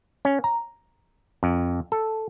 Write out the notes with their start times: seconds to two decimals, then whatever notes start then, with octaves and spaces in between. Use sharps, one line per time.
0.25 C#4
0.44 A#5
1.43 F2
1.92 A4